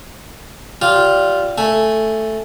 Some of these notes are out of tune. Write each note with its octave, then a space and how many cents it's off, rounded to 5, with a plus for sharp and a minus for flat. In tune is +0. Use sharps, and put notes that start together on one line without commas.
G3 -20 F4 +0
A3 +0 G#5 +0